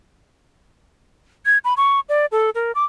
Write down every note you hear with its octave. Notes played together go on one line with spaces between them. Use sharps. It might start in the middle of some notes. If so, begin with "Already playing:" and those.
G#6
B5
C#6
D5
A4
A#4
D6